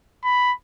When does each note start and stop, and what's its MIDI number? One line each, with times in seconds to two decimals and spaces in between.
0.24 0.53 83